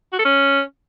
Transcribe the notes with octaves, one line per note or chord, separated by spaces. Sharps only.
F#4
A4
C#4